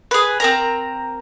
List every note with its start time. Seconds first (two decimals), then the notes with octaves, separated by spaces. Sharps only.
0.11 G#4 B4
0.40 C4 A#4 A#5